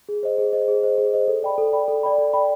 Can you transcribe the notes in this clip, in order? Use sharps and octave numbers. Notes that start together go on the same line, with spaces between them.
G#4
C5 D#5
G#4
C5 D#5
G#4
C5 D#5
G#4
C5 D#5
A4
D5 G5 B5
A4
D5 G5 B5
A4
D5 G5 B5
A4
D5 G5 B5